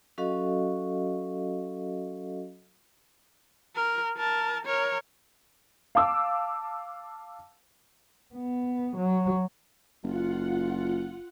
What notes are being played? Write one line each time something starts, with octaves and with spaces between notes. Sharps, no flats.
F#3 C#4 F#4 A4 D#5 F5
A#4
A#4 A5
A#4 C#5
F5 A5 D6 E6
B3
F#3
F#1 F4 F#5